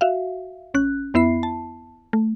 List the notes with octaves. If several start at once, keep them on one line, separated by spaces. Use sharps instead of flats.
F#4 E5 F5
A1 C#4 F#6
F2 B3 E4 E5 B5 C7
A5
A3